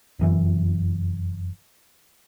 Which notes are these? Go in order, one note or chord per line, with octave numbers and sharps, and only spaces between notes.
F1 F#2 E3